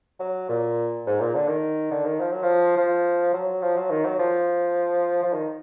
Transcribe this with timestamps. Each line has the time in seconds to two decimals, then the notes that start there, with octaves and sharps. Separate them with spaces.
0.20 F#3
0.49 A#2
1.06 G#2
1.20 A#2
1.35 D3
1.48 D#3
1.91 D3
2.05 D#3
2.20 F3
2.31 F#3
2.43 F3
2.77 F3
3.33 F#3
3.62 F3
3.76 F#3
3.90 D#3
4.05 F#3
4.19 F3
5.23 F3
5.33 D#3